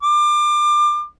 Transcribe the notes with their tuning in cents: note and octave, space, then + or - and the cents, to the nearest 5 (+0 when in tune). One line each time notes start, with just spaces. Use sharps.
D6 +30